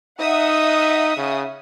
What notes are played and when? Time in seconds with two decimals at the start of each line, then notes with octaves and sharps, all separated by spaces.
0.20 D#4 E5 F#5 D#6
1.17 C#3